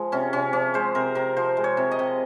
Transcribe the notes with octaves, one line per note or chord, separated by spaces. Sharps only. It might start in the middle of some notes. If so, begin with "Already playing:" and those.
Already playing: F3 G#3
C3 C#4
C3 C#4
F3 C#4
G#3 C5
C3 A#4
C3 A#4
F3 C5
G#3
C#5
C3
D#5
C3